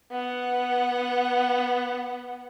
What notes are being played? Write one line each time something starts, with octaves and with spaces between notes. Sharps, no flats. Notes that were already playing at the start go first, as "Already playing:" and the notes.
B3 F#5